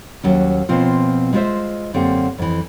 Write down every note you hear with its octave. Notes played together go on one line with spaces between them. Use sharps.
D#2 F#3 C#4
B2 F3 C4 F4
G#3 E4 F4 G#4 C5 E5
F#2 D3 A#3 C4 G4 F#5
F2 E3